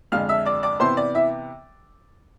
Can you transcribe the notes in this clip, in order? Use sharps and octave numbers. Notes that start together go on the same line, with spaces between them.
F2 D3 G#3 D4 F5 F6
E5 E6
D5 D6
D5 D6
C3 E3 B3 C5 C6
D5
E4 E5